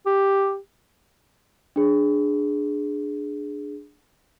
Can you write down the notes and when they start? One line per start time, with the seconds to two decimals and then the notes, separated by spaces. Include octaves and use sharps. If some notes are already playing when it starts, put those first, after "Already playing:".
0.06 G4
1.76 D4 G#4